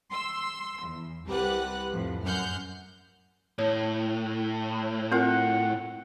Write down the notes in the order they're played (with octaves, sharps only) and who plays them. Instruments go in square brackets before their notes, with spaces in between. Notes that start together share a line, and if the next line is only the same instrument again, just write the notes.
[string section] C6 E6
E2
C2 G3 G4 B4 F#5 F#6
F2 A2
F#2 F#5 F6 G6
[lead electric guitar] A2 [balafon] C#5
[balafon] C4 F4 A#4 [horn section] F#5